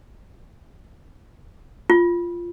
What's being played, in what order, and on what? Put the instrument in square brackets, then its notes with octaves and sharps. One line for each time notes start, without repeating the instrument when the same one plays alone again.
[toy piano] F4